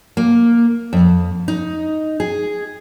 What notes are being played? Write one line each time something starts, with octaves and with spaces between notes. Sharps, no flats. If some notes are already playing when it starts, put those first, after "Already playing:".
A#3
F2
D#4
G#4